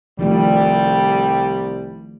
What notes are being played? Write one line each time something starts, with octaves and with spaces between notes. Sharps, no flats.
C2 D#3 F3 G3 A3